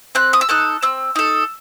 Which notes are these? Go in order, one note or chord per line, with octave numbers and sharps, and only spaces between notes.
C4 F#6
D#6
E6
D#4 A4 F#6
C4 E6
D#4 A4